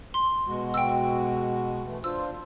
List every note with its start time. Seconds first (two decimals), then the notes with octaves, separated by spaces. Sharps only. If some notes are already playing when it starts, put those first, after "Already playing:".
0.14 C6
0.47 B2 G#3 F#4
0.74 G5 E6
1.85 E3 A3
2.04 D4 F4 C5 E6